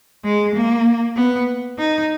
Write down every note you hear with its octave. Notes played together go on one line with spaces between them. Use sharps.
G#3
A#3
B3
D#4